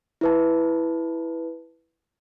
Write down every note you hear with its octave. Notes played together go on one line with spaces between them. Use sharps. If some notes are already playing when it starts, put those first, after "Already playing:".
E4 B4 A5